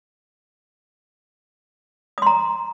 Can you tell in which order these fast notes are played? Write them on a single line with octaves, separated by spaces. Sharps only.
D#6 C6 A#5